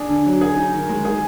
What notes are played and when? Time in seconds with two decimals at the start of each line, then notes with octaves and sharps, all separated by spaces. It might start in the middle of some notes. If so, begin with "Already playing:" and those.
Already playing: D4 G#4
0.09 D3
0.26 F#3
0.41 G#4
0.56 D#4
0.73 D#3
0.89 G#3
1.05 G#4